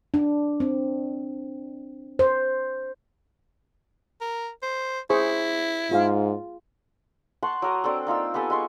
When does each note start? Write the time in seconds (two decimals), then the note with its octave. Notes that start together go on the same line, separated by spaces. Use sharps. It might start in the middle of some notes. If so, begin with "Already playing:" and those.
0.14 D4
0.60 C4
2.19 C5
4.21 A#4
4.62 C5
5.10 E4 G#4 C5 C#6
5.91 G#2 F4 G#4 F5
7.43 F#5 A5 C6 C#6
7.62 F#3 A#4 D#6
7.84 C4 D4 A4
8.07 A#3 D#4 F4 E6
8.34 B3 G4 A4 G#5
8.50 G#3 C6 C#6